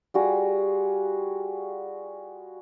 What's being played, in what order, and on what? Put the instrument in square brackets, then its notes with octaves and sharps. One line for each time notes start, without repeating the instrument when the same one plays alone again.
[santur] G3 F4 F#4 G#4